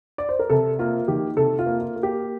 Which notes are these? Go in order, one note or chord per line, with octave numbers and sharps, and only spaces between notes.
D5
C5
A#4
C3 A4
A#3 F4
D#3 G4
C3 A4
F4
A#3
F4
A#3
G4